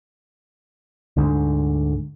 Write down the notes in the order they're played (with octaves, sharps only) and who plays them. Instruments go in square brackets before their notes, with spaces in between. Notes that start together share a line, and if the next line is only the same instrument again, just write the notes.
[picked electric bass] D2 G#2 D3